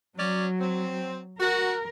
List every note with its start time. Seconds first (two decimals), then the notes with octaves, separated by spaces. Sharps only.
0.18 F#3 C#4 D5
0.60 C4
1.39 F#4 A#4